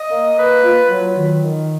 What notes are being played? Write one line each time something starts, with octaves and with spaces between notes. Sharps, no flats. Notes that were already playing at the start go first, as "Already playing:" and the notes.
Already playing: D#5
A#3
B4
F4
F#3
D#3
D#3